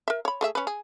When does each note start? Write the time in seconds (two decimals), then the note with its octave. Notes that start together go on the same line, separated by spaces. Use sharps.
0.08 A#4 E5
0.25 C#5 B5
0.41 A3 G#4 E5
0.55 C#4 B4
0.67 G#4